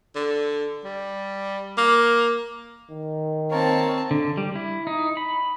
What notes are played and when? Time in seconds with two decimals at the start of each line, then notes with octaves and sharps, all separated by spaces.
0.15 D3
0.85 G3
1.78 A#3
2.91 D#3
3.51 A#3 C4 A#4 C#5 A5
4.11 D3
4.37 G3
4.55 E4
4.87 D#4
5.17 B5